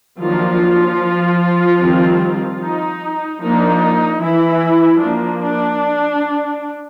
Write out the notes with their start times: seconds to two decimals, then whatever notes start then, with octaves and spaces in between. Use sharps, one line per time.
0.21 D#3 F3 F#3 A#3 D4 F4
1.81 D#3 G3 C4
2.61 D#4
3.41 F3 A#3 D4 D#4
4.21 E3 E4
5.01 F3 A#3 D4
5.41 D4